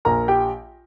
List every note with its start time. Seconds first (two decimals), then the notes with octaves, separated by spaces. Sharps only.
0.05 A#1 A#4 A#5
0.28 G4 G5